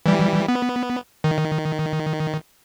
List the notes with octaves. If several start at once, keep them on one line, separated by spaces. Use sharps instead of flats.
E3 G3
B3
D#3